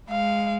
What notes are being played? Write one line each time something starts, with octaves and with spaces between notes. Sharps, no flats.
G#3 F5